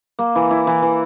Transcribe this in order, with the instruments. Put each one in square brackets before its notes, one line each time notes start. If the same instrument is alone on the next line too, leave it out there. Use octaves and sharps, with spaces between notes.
[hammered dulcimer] A#3
E3
E4
E3
E3